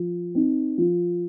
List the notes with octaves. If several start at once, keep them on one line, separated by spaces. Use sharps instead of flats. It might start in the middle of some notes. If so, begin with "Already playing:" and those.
Already playing: F3
C4 D#4
F3